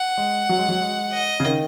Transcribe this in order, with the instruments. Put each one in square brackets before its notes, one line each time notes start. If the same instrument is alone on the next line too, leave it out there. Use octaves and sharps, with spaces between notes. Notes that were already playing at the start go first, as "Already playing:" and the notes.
Already playing: [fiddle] F#5
[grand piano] G#3
F#3
G#3
F#3
G#3
[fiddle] D#5
[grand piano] C#3
D#3